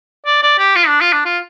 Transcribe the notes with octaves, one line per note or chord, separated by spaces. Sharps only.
D5
D5
G4
F4
D4
F4
D4
F4